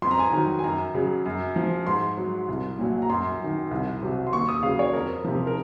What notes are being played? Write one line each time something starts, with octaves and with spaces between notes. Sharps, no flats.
F2 C6
A#5
G#5
A#5
D#3 F#3
G#5
F#2 A#5
C#3 F#3
F#2
F3
G#2 C6
F#3
C2
A#2 F#3
A#5
F#2 C6
D#3 F#3
C2
C3 F#3
C6
D#2 C#6
D#6
C#3 F#3 F5
C#5
F2 A#4
C3 F3
A#4